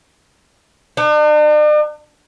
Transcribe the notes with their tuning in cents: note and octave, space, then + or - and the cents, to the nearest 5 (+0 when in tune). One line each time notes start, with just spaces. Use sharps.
D4 +45